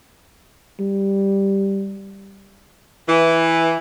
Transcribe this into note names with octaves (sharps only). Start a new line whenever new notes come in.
G3
E3